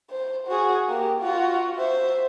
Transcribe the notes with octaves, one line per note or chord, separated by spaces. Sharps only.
C5
F#4 G#4
A#3 G4
F4 F#4
C5 E5